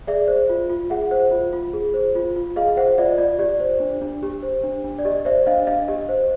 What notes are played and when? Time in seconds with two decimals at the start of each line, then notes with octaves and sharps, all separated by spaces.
0.07 G#4 D5 E5
0.28 C5
0.49 F4
0.69 F4
0.90 G#4 E5 F#5
1.11 C5
1.32 F4
1.53 F4
1.73 G#4
1.94 C5
2.15 F4
2.36 F4
2.56 G#4 D#5 F5
2.77 C5 E5 F#5
2.98 F4 D5 E5
3.10 D#5
3.18 F4 D5
3.39 G4 D5
3.60 C5
3.80 D4
4.01 D4
4.23 G4
4.43 C5
4.63 D4
4.84 D4
4.99 D5
5.05 G4 D#5
5.25 C5 D5 E5
5.47 D4 D#5 F5
5.67 D4 D#5 F5
5.88 G4 D#5
6.09 C5